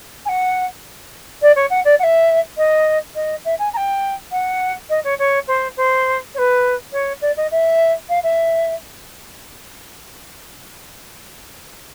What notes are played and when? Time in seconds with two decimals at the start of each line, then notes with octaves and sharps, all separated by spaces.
0.25 G#5
0.29 F#5
1.42 D5
1.56 C#5
1.70 F#5
1.85 D5
1.99 F#5
2.03 E5
2.57 D#5
3.15 D#5
3.45 E5
3.59 G#5
3.73 A#5
3.77 G5
4.32 F#5
4.90 D#5
5.04 C#5
5.19 C#5
5.48 C5
5.77 C5
6.34 C#5
6.38 B4
6.93 C#5
7.21 D5
7.37 D#5
7.51 E5
8.09 F5
8.23 E5